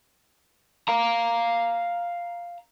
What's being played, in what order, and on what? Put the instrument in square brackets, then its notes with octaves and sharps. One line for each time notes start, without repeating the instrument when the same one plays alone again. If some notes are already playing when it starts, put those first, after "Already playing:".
[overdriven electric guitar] F5 A#5